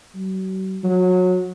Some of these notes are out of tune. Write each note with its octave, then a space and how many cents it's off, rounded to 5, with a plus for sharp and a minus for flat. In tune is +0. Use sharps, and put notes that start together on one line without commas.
F#3 +40
F#3 -20